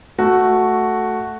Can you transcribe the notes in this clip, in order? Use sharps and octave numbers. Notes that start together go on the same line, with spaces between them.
A3 F#4